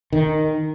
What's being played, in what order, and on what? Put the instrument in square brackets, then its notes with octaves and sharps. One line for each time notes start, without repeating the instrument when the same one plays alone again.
[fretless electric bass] D#3